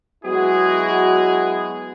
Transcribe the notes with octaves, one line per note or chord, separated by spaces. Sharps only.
F#3 G#3 B3 E4 F#4 G#4